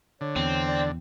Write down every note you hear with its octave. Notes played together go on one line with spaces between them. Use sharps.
D3 C#5
E2 C4
D5